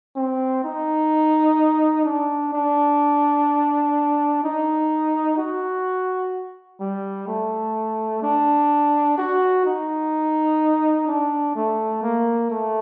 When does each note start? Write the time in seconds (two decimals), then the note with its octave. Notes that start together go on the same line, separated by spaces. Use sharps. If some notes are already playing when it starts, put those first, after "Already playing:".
0.16 C4
0.64 D#4
2.05 D4
2.53 D4
4.44 D#4
5.38 F#4
6.80 G3
7.28 A3
8.23 D4
9.18 F#4
9.66 D#4
11.08 D4
11.55 A3
12.02 A#3
12.50 A3